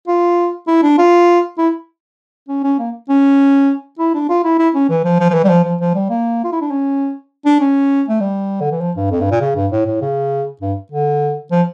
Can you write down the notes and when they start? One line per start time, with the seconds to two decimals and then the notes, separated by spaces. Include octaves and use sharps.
0.08 F4
0.67 E4
0.82 D4
0.98 F4
1.58 E4
2.48 C#4
2.64 C#4
2.79 A#3
3.09 C#4
3.99 E4
4.15 D4
4.29 F4
4.44 E4
4.59 E4
4.74 C#4
4.90 E3
5.05 F3
5.19 F3
5.30 F3
5.34 E3
5.44 G3
5.49 F3
5.64 F3
5.80 F3
5.94 G3
6.10 A#3
6.44 F4
6.52 E4
6.61 D4
6.71 C#4
7.45 D4
7.60 C#4
8.08 A3
8.21 G3
8.61 D3
8.71 E3
8.81 F3
8.96 G2
9.11 F2
9.21 G2
9.31 A#2
9.41 C#3
9.56 G2
9.72 A2
9.86 A2
10.01 C#3
10.61 G2
10.92 D3
11.51 F3